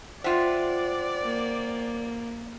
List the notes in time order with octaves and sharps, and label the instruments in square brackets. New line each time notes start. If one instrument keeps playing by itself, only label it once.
[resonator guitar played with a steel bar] F4 E5 [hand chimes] C5 F#5 G5 [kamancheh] D5
[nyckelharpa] A#3